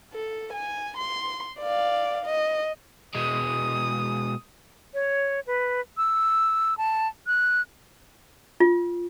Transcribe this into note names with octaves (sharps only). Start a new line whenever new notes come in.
A4
G#5
C6
D5 F5
D#5
B2 G#3 D#6
C#5
B4
E6
A5
F#6
F4